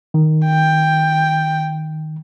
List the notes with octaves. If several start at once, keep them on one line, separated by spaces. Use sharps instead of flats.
D#3
G5